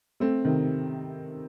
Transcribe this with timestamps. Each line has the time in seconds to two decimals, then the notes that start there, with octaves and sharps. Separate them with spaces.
0.20 A3 C4
0.45 C3 D#3